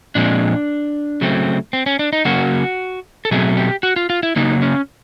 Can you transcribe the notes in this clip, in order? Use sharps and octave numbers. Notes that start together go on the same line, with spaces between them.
A#2 F3 G#3 C4 D4
C#3 F#3 A3 C4
C4
C#4
D4
D#4
C#3 F#3 A#3 F#4
A4
B2 F#3 A3 C4 G#4
G4
F#4
F4
F4
E4
C#3 F#3 A#3 D#4
C#4